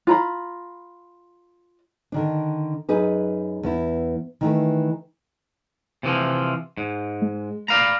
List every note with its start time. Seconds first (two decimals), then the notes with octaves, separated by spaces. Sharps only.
0.07 F4 A#5 B5
2.12 D3 D#3 D4
2.89 F#2 D#4 G#4 B4
3.63 E2 B3 E4
4.41 D#3 E3 A3
6.03 C3 E3 F3
6.77 G#2
7.22 G#3
7.68 D5 F5 A#5 B5